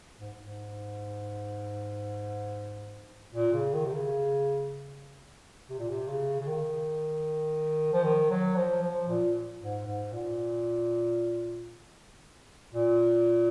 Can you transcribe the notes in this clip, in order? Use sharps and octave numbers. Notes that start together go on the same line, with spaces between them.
G#2
G#2
A#2
C#3
D#3
C3
C#3
C3
A#2
C3
C#3
C#3
D#3
F3
D#3
F#3
F3
F3
A#2
G#2
G#2
A#2
A#2